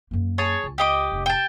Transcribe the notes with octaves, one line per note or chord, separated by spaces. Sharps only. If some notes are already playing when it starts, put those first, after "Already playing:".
F#2 A#3
G#4 C#5 A5
C#2
G4 D#5 D6
F1 A2
G5 A5